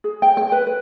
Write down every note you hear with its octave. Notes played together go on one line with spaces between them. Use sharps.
G#4
G5
G5
B4
B4